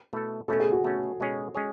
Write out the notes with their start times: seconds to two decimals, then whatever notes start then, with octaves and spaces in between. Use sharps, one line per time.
0.13 B2 A3 E4 A4
0.48 B2 A3 C#4 A4
0.60 G#4
0.72 F#4
0.84 B2 A3 C#4
1.20 B2 G#3 C#4 G#4 C#5
1.55 G#3 C#4 G#4 C#5